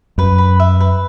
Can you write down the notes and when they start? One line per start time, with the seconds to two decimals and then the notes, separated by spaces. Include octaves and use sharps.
0.18 F#2 B4
0.38 B5
0.60 E5
0.80 B4